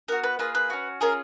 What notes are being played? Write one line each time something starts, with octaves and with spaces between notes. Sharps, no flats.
B3 F#4 A#4
B4
A#3 F4 G#4 B4
B4
C#4 F#4
C#4 F4 G#4 A#4